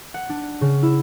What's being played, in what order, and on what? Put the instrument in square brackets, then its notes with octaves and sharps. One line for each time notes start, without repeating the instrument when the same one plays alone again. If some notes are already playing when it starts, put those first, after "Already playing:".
[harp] F#5
D4
C#3
E4